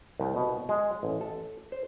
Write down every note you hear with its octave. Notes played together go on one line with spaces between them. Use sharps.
C2
B2
G#3
A1
A4
C5